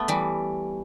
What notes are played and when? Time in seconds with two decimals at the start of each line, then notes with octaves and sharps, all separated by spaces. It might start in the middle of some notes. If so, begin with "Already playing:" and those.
Already playing: A3 B3
0.08 E3 G3